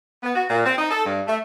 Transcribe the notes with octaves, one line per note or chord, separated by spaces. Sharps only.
B3
F#4
A#2
C4
D#4
A4
G2
A3